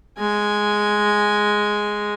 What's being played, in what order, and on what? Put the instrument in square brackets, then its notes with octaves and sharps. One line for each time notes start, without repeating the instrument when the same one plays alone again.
[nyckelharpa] G#3 G#5